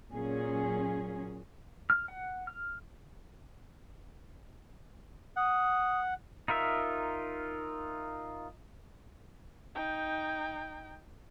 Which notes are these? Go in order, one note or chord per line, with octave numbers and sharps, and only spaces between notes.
A#2 F#3 C#4 G#4
F6
F#5
F6
F#5 D#6
D#4 F4 A#4 E5
D#4 G5